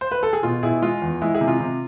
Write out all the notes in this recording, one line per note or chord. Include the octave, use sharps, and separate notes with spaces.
C5
B4
A4
G#4
B2 F4
B2 E4 G#4
G#3 F4
E2
G#3 E4
E4 G#4
C3
F4
C3